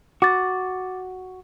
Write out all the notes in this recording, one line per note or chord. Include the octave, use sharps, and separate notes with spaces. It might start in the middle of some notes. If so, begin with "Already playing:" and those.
F#4 D6 A6